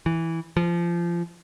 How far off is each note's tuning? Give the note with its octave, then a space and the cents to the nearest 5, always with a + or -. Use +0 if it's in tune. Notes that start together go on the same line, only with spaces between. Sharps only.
E3 -5
F3 -25